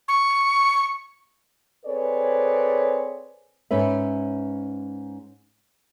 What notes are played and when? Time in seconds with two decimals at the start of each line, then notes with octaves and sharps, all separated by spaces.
0.08 C#6
1.86 C4 G#4 A4 B4 C#5 D5
3.71 G#2 C#4 B4 E5